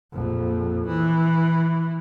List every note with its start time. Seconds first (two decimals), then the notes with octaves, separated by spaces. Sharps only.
0.13 A#1 F2
0.87 E3